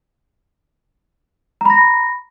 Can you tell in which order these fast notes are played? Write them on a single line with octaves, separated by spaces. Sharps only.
A#5 B5 A#6